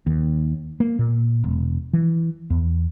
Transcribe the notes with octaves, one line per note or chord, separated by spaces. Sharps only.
D#2
A#3
A#2
E1
E3
E2